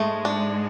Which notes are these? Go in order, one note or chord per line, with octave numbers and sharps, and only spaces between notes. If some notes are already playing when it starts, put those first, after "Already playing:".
Already playing: G#2 G#3 A3
D4